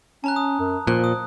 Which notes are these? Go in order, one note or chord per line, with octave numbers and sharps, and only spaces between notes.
C#4 A5 A#5 F#6
D#6
F#2
A#2 F3 F#6
D#6